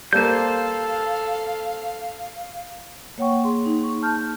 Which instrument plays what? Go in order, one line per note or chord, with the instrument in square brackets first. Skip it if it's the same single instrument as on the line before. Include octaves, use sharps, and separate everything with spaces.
[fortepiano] G3 A#3 [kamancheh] A4 [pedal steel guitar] C5 G6 [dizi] F5
[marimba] A#3 C#5 F#5 G5 C#6
G#4 C6
D#4
C#6
A5 F6 G6